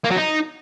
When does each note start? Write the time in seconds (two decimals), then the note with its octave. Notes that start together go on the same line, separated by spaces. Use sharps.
0.05 A#3
0.11 F#3
0.17 D#4